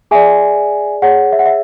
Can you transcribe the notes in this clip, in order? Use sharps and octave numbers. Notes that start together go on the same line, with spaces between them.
G#4 D5 E5 G#5
G#4 C#5 F#5
E5
F#5
E5